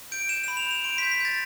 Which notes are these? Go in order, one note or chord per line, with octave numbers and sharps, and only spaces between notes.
G6 D7
G6 E7
B5 E7
F7
G6 E7
C6 D7
B6
G6
B6
G6 A6